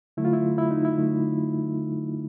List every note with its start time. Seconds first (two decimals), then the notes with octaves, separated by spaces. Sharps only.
0.17 D3 F#3 A3 E4
0.25 F4
0.33 E4
0.58 E4
0.71 D#4
0.85 E4
0.98 D3 F#3 A3